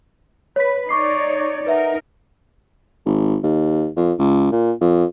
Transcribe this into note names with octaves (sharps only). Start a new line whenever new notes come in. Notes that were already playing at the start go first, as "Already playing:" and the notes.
B4 C#5 B6
D#4 C#5 D5 C#6 D6 C7
D#4 A#4 B4 E5 F#5
G#1
D#2
F2
C#2
A#2
F2